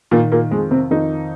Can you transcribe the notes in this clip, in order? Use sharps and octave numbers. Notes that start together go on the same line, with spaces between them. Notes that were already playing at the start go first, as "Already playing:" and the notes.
A#2 D#3 A#3
A#2 A#3
F2 G#3
C3 C4
F2 D#3 D#4